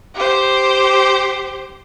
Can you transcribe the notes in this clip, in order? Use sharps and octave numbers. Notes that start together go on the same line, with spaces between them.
G4 C5